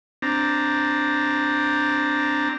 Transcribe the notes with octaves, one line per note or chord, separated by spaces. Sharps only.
C4 D4 A#5